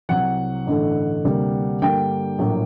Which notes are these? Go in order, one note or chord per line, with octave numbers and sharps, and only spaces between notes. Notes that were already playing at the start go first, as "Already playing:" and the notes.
C2 C3 F#3 F#5
A1 G2 D3 A3
D2 C3 G3 A#3
G2 D3 G3 A#3 G5
A#1 A2 F#3 A#3